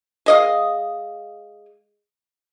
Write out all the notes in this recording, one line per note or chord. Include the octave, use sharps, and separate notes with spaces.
G#3 D#5 F5